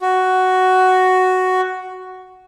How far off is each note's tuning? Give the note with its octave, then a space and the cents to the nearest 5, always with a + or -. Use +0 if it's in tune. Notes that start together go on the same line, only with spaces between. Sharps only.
F#4 +5